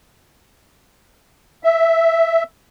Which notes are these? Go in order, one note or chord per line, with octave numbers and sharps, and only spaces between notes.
E5